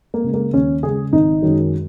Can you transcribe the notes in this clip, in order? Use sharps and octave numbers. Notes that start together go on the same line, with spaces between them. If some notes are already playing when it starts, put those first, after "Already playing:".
A#3
C#3 G#3
A#3
D#2 C#4
C#3 G#3 G#4
G#1 D#4
F#2 D#3 G#3